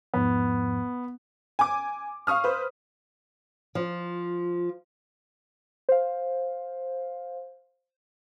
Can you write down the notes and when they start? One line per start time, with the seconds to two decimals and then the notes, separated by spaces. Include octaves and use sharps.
0.14 E2 G#2 F3 B3
1.59 G#5 D6
2.27 F5 C#6 D#6 F6
2.44 B4 C5
3.75 F3
5.89 C5 F5